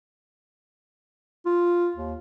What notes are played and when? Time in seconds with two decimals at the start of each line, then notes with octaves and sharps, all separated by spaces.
1.46 F4
1.96 D#2